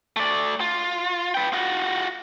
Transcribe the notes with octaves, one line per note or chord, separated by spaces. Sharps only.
A3 D5
F4
B4 G5
F4 F#4